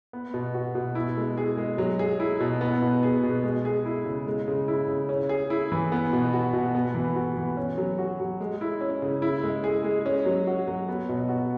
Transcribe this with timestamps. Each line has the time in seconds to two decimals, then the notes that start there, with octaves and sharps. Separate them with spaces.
0.13 B3
0.34 B2
0.54 F#4
0.75 B2
0.95 E4
1.17 G#3
1.37 G#4
1.57 G#3
1.78 F#3
1.99 G#4
2.20 E4
2.40 B2
2.61 B3
2.82 B2
3.03 G#4
3.23 B2
3.43 G#3
3.65 G#4
3.85 E4
4.05 C#3
4.27 G#3
4.48 C#3
4.68 E4
4.88 C#3
5.09 C#4
5.29 G#4
5.50 E4
5.72 E3
5.92 B3
6.13 B2
6.33 F#4
6.53 B2
6.75 B3
6.95 E3
7.16 F#4
7.37 E3
7.57 C#4
7.78 F#3
7.99 F#4
8.20 F#3
8.40 G#3
8.61 E4
8.81 C#4
9.02 C#3
9.22 E4
9.43 G#3
9.64 G#4
9.84 G#3
10.06 C#4
10.26 F#3
10.47 F#4
10.67 F#3
10.88 B3
11.09 B2
11.29 F#4